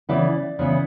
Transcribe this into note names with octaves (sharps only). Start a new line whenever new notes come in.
C#3 E3 B3 E4 D5
C#3 E3 B3 E4